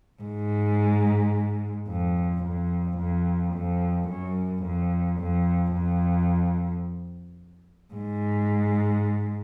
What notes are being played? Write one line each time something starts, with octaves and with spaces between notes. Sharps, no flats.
G#2
F2
F2
F2
F2
F#2
F2
F2
F2
G#2